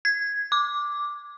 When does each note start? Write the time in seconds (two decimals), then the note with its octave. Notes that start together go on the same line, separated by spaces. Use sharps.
0.05 G#6
0.52 D6